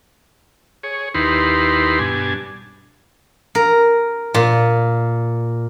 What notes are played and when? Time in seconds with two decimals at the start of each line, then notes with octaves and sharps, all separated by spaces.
0.83 G#4 C#5
1.14 D#2 D#4 E4 G4 B4 C6
1.99 G2 B2 D4 G#5
3.55 A#4
4.34 A#2